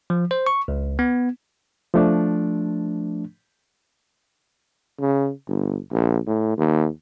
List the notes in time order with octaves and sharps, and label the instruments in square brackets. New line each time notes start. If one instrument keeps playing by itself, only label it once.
[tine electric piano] F3
C5
C#6
C#2
B3
[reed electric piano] F3 A3 D4
[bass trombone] C#3
G1
A#1
A2
D#2